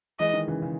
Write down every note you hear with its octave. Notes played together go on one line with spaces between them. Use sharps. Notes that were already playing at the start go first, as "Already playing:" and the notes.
E3 G#3 D#5
D#3
C#3 E3
C#3